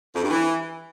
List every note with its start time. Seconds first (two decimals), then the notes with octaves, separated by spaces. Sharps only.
0.15 F2
0.22 G2
0.30 E3